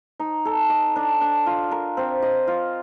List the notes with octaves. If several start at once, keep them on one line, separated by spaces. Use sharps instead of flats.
D#4
A4
D#5
D4
D4
F4
A#4
C4
D#5
F4